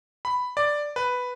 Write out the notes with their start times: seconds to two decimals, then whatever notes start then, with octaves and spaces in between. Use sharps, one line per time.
0.25 B5
0.57 D5
0.96 B4